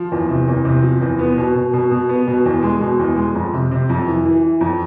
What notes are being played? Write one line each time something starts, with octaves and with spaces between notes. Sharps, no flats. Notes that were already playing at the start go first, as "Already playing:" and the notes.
Already playing: F3
E2
C3
E2
C3
F3
E2
B3
B2
B2
B2
B2
B3
B2
E2
G#3
B2
E2
G#3
F2
C3
C3
F2
E3
E3
E3
F2